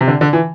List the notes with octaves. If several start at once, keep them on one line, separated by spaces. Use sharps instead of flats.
C3
D3
D3
E3